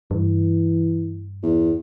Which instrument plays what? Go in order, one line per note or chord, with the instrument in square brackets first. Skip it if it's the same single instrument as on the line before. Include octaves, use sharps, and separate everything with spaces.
[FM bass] G2 [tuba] E3
[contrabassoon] E2